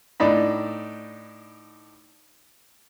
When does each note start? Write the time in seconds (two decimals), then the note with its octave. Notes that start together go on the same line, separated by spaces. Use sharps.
0.20 A2 D4 D#4 B5